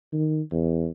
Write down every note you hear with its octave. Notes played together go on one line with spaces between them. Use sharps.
D#3
E2